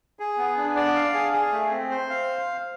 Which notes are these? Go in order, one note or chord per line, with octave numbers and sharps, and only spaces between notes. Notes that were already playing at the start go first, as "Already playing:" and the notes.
G#4
B3
D4
D5
F5
G#4
G#4
A3
C4
C5
F5